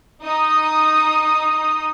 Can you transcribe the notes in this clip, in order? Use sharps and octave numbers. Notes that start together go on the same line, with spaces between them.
D#4 D#6